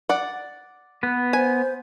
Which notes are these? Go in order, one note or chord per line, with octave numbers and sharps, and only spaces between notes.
D5 F#5
B3 B4
C5 G#5